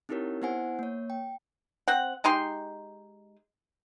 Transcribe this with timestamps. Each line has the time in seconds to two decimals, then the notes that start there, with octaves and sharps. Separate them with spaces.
0.09 C4 D#4 E4 G4 A#4 C#5
0.42 B3 E4 C5 F#5 G#5
0.79 A#3 C#5
1.10 G5
1.88 C4 F#5
2.24 G#3 D#4 G4 C6